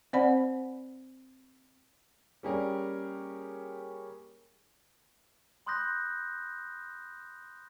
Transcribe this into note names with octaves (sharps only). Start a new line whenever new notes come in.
C4 C5 D5 F#5 B5
G3 A#3 C#4 G4 G#4 A#4
B5 C6 D#6 F#6 G6 A#6